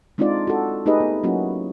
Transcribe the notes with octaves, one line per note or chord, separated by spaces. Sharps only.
G#3 C4 D4 D#4 F4 D5
F#4 A4
A3 D#4 G4 G#4 B4 D#5
B3
F#3 A#3 C#4 E4 F#4